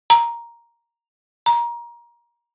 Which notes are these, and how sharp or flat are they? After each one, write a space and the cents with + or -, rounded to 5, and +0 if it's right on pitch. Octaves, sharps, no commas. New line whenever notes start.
A#5 +5
A#5 +25